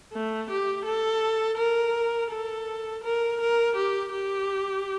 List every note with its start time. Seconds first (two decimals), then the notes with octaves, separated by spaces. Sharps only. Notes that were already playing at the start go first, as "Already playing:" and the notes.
0.13 A3
0.50 G4
0.85 A4
1.58 A#4
2.31 A4
3.03 A#4
3.40 A#4
3.75 G4
4.12 G4